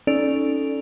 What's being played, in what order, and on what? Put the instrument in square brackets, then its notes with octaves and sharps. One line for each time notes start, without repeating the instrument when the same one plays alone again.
[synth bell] C#4 D#4 A4 D5 D7 F7